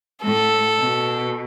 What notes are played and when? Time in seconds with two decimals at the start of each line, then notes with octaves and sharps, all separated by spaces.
0.23 A2 A4
0.78 B2